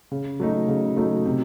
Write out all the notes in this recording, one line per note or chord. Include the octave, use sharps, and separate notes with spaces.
C#3
F#3 A3 D#4
C#3
F#3 A3 D#4
C3